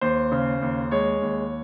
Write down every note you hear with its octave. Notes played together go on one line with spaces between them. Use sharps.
D#2 C5
C#3
D#2
G#3 C#5
D#2